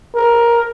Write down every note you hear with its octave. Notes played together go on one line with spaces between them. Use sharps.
A#4